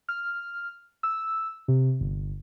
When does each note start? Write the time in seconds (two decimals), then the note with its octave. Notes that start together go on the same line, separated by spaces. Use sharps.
0.09 F6
1.03 E6
1.68 C3
2.01 G1